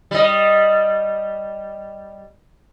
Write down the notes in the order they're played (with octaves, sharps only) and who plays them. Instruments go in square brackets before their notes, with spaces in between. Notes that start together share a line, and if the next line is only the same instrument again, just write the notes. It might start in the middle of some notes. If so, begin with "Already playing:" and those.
[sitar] G3 D#5